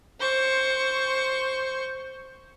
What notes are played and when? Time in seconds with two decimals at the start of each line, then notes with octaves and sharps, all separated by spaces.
0.20 C5 C#6